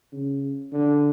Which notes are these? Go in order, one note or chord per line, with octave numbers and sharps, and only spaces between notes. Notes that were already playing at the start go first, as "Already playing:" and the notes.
C#3
D3